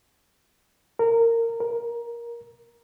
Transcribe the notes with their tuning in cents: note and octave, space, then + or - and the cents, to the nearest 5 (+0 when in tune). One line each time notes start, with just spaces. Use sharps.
A#4 -20
A#4 +15